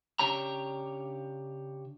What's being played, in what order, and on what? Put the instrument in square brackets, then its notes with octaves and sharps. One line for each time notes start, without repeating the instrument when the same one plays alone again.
[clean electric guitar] C#3 D4 G4 C#5 A#5